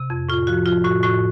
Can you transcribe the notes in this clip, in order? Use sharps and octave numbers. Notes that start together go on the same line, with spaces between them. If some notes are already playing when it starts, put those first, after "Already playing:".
Already playing: C3
F2
A2 F4
F3 F#4
F3 F4
A2 F#4
A2 F#4